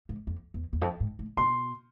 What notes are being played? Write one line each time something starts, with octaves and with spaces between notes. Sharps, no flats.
G#2
F2
E2
E2
F2
G#2
A2
B2 C6